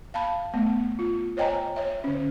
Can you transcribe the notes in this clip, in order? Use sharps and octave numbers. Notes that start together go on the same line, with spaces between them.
F5 A5 B5
A3 B3
F4
C5 C#5 D#5 G5 G#5 A#5
C#5 E5
D3 C#4